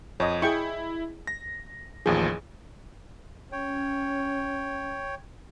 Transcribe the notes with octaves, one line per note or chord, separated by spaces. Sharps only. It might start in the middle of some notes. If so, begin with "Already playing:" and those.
F2 C#5 D#5
E4 G#4 G5 C#6
A#6
A1 D#2 F3 G#4
C#4 C#5 G5